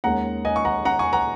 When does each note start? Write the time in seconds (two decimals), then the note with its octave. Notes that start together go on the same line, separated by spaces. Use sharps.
0.04 D#2 D#3 G#3 C#4 F#5 A#5
0.45 D#5 G#5
0.56 C#6
0.65 F#5 A#5
0.85 F#5 A#5
0.99 G#5 C#6
1.13 F#5 A#5